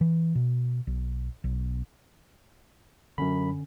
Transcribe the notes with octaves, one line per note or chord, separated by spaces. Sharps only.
E3
B2
B1
B1
F#2 D3 C#4 B5